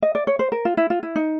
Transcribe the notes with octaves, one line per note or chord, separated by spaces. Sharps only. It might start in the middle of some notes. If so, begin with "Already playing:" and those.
D#5
D5
C#5
C5
A#4
F4
E4
F4
E4
D#4